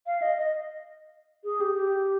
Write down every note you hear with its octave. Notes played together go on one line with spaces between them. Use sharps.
F5
D#5
D#5
G#4
G4
G4